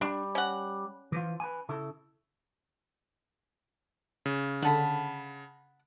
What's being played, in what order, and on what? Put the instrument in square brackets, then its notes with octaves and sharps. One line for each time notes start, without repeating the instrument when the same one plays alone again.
[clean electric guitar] G3 [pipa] D4
[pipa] C#4 F#5
[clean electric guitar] E3 F3 F4
B4 G#5
C#3 E4 A4
[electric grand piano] C#3
[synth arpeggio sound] D3 [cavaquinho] F#5 A5 B5